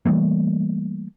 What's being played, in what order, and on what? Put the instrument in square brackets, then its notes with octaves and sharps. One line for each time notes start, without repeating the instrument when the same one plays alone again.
[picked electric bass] E3 G3 A3 A#3